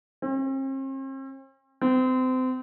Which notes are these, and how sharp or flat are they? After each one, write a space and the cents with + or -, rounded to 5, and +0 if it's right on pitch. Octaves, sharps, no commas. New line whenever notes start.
C4 +45
C4 -30